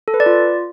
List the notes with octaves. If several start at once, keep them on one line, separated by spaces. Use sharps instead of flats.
A4
B4
D5
F4